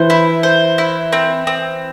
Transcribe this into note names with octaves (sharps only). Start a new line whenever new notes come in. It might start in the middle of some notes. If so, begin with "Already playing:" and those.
Already playing: E3 C5
E4
C5
E4
C4
C4